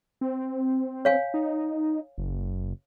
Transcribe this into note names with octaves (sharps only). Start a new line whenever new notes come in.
C4
C#5 F5 G#5
D#4
F#1